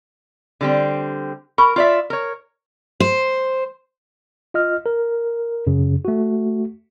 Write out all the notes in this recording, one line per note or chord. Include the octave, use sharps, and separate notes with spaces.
D3 G3 C4
A#4 B5 C#6
F4 D5 E5
A#4 C#5
C5
F4 D#5 F6
A#4
F#2 C#3
A3 F#4